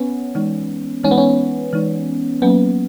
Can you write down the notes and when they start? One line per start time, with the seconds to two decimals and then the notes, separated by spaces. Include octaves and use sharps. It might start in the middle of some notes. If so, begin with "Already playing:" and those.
Already playing: B3 C#4
0.35 E3 G#3 D#4
1.04 E3 G#3 C#4 D#4
1.11 B3
1.18 C#4
1.73 E3 G#3 D#4
2.42 F#3 A#3 B3 C#4